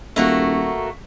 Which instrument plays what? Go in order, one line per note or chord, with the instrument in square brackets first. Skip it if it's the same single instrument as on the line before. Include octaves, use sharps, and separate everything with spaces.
[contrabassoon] D#1 [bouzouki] A3 A#3 F#4